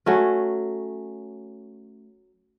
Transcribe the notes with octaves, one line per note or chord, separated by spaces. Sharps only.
F#3 A3 C#4